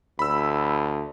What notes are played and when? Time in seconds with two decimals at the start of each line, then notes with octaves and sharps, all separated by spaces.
0.19 D2 B5 E6